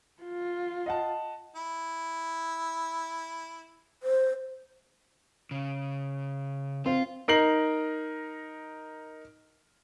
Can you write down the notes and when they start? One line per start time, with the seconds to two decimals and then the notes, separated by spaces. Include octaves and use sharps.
0.23 F4
0.86 D#5 F#5 A5
1.56 E4
4.03 C5
5.51 C#3
6.86 C4 F4
7.28 D#4 A#4 C7 F#7